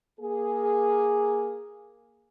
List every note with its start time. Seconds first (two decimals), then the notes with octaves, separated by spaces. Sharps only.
0.20 A#3 G#4